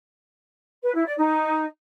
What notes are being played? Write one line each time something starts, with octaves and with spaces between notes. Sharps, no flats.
B4
E4
D5
D#4